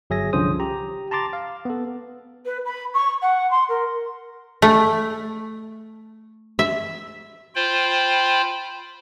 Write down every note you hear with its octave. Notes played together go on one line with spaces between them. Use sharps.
G1 F#3 G#4 E5 G#5 A#6
C2 D3 F3 C#4 C5 D#6
G4 A#5
A5 A#5 C6 D6 A6
F5
B3 A4
B4
B5
C#6
F#5
C6
A#4
A3
E5
F4 C5 G5 B5